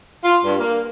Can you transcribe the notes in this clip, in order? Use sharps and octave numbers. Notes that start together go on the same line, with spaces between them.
F4
G2
A#3